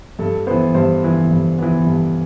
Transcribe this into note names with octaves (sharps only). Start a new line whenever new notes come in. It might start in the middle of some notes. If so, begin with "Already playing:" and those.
G2 A4
E3 B3 C5
G2 C5
E3 B3
G2
E3 B3
G2